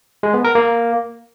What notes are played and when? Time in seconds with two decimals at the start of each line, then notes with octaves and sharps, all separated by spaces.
0.23 G#3
0.34 B3
0.44 A#4
0.55 A#3